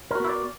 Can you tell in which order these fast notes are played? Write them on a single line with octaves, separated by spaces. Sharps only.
A#4 F#4 B3 E4 D5